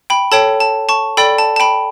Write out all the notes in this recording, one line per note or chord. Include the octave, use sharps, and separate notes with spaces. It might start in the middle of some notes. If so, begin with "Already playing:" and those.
G5 B5
A4 C#5 G5 A5
A5
A5 C#6
A4 D5 G5 B5
A5
A5
G5 B5